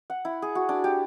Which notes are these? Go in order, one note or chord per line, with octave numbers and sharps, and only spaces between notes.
F#5
E4
G#4
F#4
D4
G4